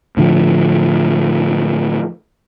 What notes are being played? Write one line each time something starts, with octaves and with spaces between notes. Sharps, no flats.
A2 D3 F3